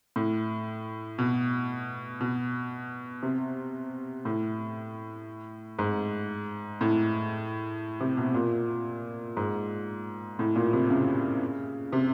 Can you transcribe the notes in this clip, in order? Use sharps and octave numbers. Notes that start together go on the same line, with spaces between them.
A2
B2
B2
C3
A2
G#2
A2
C3
B2
A#2
G#2
A2
A#2
C3
C#3
C3